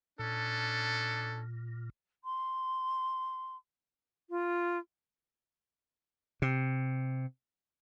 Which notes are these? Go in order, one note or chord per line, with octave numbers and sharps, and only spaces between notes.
A#2 C#4 D4 A4
C6
F4
C3